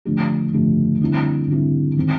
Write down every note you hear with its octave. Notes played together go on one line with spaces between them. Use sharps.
D3 F3 A3 D4 G4
D3 F3 A3 D4 G4
D3 G3 C4 E4
D3 G3 C4 E4
D#3 G#3 C4